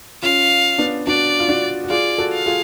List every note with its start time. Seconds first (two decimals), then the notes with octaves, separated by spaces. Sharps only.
0.23 C#4 F4 F5
0.78 B3 D4
1.07 D4 F#4 D5
1.40 F4
1.49 D4 F#4
1.84 F#4
1.90 F4 G#4 D5
2.18 F#4 A4
2.32 F5
2.46 F4 G#4